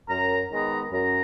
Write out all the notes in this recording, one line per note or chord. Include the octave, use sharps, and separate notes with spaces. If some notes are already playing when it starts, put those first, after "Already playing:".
F#2 A#5
D#3 G#3 B3 A#5
F#2 A#5